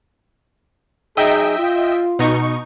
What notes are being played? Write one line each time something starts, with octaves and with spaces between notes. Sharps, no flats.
F#3 D#4 G#4 D#5 E5 G5
F4
B2 D#4 C#6